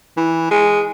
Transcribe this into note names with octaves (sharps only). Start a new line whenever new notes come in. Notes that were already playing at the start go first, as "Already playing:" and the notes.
E3
G#3